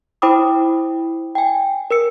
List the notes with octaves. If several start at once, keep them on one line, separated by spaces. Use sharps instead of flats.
E4 C5 G5 B5 D6 D#6
G5 G#5
A#4 E6 C#7